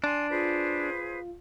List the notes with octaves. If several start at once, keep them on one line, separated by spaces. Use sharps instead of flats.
D4 G#5 C6
F4 G#4 B4 C5